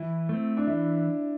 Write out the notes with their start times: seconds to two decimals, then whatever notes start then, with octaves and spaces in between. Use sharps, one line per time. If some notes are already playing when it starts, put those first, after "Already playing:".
Already playing: E3 E4
0.29 A3 C4
0.57 D4
0.67 E3 E4